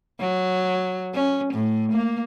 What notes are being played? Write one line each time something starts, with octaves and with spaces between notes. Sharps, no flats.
F#3
C#4
A2
A#3